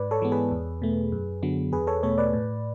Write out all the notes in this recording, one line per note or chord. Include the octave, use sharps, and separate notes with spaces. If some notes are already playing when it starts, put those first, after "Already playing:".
Already playing: G#2 B4 D5
A4 C#5
E3 G#3 B3
G#4 B4
E2
B2 A3
F#2
D3 F#3 B3
E2 G#4 B4
A4 C#5
B2 A3 A4 C#5
B4 D5
A2